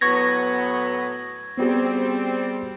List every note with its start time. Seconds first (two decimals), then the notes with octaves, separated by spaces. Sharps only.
0.01 A2 F#3 B3 C#6 G#6 A#6
1.58 G3 B3 C4 F#4 G#4